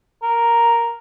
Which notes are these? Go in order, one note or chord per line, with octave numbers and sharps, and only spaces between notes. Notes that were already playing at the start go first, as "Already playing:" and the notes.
A#4